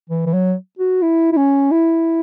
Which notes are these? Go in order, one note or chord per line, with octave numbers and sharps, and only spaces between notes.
E3
E3
F#3
F#4
E4
E4
C#4
E4